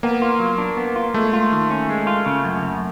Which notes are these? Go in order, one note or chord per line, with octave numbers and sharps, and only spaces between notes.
A#3 B3
F4
F#3
D4
B3
F4
G#3 A3
F4
D#3
C#4
G#3
F4
C#3
F#2
F#2